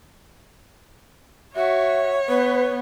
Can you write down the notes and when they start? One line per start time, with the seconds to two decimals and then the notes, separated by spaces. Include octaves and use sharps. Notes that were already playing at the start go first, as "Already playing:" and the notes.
1.55 F#4 C#5 E5
2.28 B3 B4